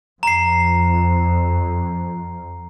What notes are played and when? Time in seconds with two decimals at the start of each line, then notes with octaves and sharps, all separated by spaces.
0.23 F2 A#5 C7